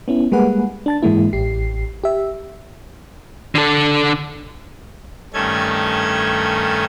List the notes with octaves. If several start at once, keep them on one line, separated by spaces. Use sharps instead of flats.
B3 C#4 E4
G3 G#3 A#3 G#4 B4 F#5
D4 A5 A6
G#2 E3 G#3 A#3 E4
A1 G4 C7
G4 E5
D3 A4
G2 D#3 A3 C#4 A4 G#6